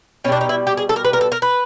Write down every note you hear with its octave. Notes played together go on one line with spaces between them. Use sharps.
B2 G3 C#4 D4
D#4
E4
G4
G#4
A4
A#4
B4
A#4
A4
A#4
B4